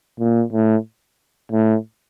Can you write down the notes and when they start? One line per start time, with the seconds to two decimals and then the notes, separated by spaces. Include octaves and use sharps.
0.20 A#2
0.53 A2
1.52 A2